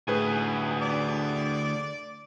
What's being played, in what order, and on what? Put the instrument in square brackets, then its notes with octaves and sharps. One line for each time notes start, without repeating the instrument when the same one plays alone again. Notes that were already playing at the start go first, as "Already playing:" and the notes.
[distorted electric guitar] D2 G#5 [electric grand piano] A2 G#4 B4
[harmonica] D5